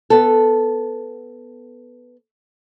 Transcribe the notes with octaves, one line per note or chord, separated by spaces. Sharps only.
B3 A4